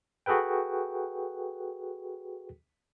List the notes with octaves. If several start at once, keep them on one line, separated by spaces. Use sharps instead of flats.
F#4 G#4 A4 B4 G5